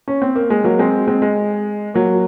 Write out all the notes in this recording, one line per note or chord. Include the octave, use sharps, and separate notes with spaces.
C#4
C4
A#3
G#3
F#3 A#3
G#3 C4
G#3 C4
G#3
F#3 A#3